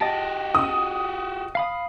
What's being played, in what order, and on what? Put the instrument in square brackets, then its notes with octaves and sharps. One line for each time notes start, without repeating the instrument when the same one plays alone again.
[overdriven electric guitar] F#4 G4 [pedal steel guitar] D#5 A5
[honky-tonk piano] D#6
[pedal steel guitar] F5 B5 D#6